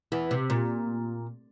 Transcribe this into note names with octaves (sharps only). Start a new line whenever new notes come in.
E2 E3
C3
A#2